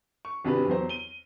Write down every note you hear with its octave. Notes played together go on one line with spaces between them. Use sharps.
C#6
G#1 C3 D4 G4 B4
E2 F#3 C5
D#7 G7